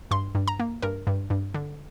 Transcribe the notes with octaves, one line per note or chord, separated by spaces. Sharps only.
G2 C6
G2
A#5
A#3
G2 A#4
G2
G2
D3